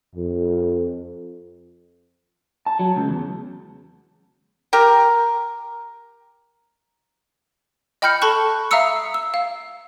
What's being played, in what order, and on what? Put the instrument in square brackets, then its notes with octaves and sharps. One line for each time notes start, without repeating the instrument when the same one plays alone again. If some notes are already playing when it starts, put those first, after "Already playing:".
[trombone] F2
[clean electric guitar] A5
F#3
C#2
E2
[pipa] G4 A#4
[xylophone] D#5 G5 B5 F6 G6 C#7
A4 A5 B5 C#6 F#6
E5 F5 A#5 D#6 E6 C#7
E6
F5